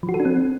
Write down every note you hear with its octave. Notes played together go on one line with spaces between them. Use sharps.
F3
F#4
A4
D4
C4